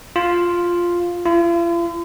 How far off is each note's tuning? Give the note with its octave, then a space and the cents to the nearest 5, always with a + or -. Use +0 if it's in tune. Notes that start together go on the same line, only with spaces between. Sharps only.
F4 +0
F4 -45